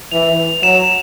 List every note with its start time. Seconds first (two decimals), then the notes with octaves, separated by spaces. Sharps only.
0.11 E3 F7
0.63 F#3 E7